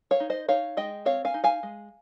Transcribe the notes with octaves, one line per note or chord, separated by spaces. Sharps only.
C#5 F5
D#4
C5 D#5
D#4 C#5 F5
G#3 D#5 G5
C4 C#5 F5
F5 G#5
D#4
F5 G#5
G#3